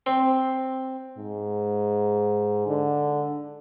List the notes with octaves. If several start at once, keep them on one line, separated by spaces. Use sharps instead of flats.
C4
G#2
D3